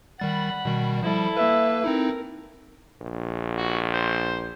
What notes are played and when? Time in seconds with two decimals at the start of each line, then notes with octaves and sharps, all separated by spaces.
0.20 D#3 G3 F#5 B5 A6
0.65 B2 D#3 G3
1.03 F3 G3 E4 A4
1.37 A#3 B4 E5
1.84 C4 D#4 E4 A#4
3.01 A#1
3.57 F#4
3.93 C5